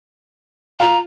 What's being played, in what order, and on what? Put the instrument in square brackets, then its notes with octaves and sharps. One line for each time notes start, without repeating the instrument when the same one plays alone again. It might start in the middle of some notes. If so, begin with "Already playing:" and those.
[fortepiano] F4 [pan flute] A#5